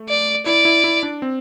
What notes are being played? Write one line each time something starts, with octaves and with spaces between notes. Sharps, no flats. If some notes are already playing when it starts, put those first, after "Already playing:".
Already playing: A3
D5
E4 D5
E4
E4
D4
C4